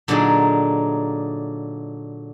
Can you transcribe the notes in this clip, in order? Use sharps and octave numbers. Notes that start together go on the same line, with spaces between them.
A#2 D3 F#3 A#3 D#4 G#4